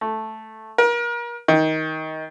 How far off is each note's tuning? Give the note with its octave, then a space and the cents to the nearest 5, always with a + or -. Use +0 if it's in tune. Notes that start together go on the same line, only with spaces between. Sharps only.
A3 -5
A#4 +35
D#3 +20